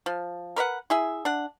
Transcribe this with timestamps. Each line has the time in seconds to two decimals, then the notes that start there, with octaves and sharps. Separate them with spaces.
0.06 F3
0.56 A#4 B4 D#5 F#5
0.90 E4 G#4 E5
1.25 D4 F#5